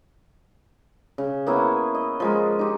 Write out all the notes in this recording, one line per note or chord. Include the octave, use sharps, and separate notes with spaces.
C#3
A#3 B3 E4 C#5
D#5
F3 G#3 A#4
D#4 G4